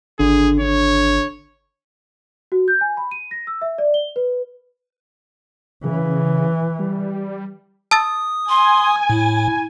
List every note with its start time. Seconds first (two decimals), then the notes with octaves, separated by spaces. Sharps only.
0.19 G#1 D3 G#4
0.60 D3 C#5
2.52 F#4
2.68 G6
2.81 G#5
2.97 B5
3.11 D#7
3.31 A#6
3.47 E6
3.62 E5
3.78 D5
3.94 G7
4.16 B4
5.84 C#3 E3
6.79 G3
7.91 A5 D#6 E6 A6
8.49 G#5 C6
9.10 A2 E4